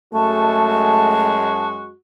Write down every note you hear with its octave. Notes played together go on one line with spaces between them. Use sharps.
F#2 G#3 A3 F#4 A5